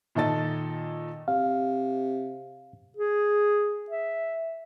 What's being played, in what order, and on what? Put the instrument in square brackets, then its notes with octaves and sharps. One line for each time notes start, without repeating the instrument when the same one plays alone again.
[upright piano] A#2 D#3 D#4 A4 A6
[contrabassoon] C3 [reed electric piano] F5
[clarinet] G#4
E5